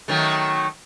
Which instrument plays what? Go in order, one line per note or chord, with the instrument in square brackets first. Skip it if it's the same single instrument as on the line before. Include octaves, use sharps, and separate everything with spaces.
[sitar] D#3 F#3 A3